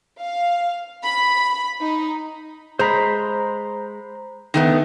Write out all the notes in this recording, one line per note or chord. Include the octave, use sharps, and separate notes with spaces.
F5
B5
D#4
G#3 C5 A#5 B5
D#3 A3 B3